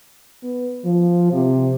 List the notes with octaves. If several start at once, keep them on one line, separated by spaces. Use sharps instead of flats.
B3
F3
C3